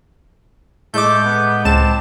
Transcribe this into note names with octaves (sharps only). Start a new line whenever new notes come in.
A2 G#3 A3 D#5 D6 G6
B3
C#2 C4 A5 E7